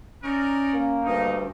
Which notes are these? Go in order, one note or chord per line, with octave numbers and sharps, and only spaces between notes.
C#4 D#4 A#4 D5
A#3
D2 G2 D#4